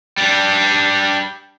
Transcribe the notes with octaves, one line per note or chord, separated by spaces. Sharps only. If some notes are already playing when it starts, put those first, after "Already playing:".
G3 D4